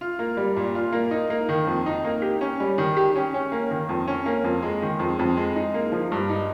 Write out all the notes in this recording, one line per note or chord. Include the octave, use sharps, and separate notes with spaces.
F4
A#3
G3
A#2
F4
A#3
D#4
A#3
D#3
F2
D#4
A#3
G4
C#4
G3
D#3
G4
C#4
C#4
A#3
D#3
F2
C#4
A#3
F2
G#3
D#3
F2
F2
G#3
D#4
A#3
F3
G2
D#4